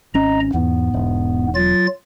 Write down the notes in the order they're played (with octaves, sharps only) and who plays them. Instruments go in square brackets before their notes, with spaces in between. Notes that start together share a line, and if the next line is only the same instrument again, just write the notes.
[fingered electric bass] G#1 C#4 [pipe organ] D#5 A#5
[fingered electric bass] E2 [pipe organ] G#2 B3
[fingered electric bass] E1
[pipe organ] F#3 F4 A6